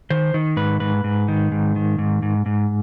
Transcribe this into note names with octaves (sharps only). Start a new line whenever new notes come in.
D#3 C5
D#3
G#2 B4
G#2 B4
G#2
D#3
G#2
D#3
G#2
G#2
G#2